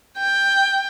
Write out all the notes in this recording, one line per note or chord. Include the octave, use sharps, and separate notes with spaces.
G5